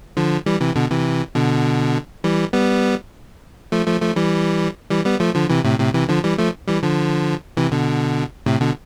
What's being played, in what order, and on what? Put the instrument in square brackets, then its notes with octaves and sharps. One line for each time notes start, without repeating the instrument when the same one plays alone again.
[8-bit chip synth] D3 F3
E3 G3
C3 E3
B2 D3
C3 E3
B2 D3
E3 G3
G3 B3
F3 A3
F3 A3
F3 A3
E3 G3
E3 G3
G3 B3
F3 A3
D3 F3
C3 E3
A2 C3
A2 C3
C3 E3
D3 F3
E3 G3
F3 A3
E3 G3
D3 F3
C3 E3
B2 D3
A2 C3
B2 D3